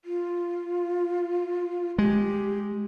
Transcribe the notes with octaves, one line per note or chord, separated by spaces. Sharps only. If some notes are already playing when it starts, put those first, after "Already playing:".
F4
G#3 G4